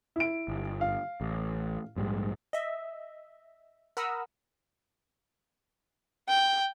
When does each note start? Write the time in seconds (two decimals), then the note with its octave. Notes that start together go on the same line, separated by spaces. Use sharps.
0.16 E4 D7
0.48 G1
0.81 F5
1.21 A1
1.96 A#1 G#2 G3
2.53 D#5 E5
3.97 A#4 F#5 A#5 B5 D#6 E6
6.28 G5